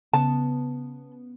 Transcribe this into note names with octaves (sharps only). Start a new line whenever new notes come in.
C#3 B3 A5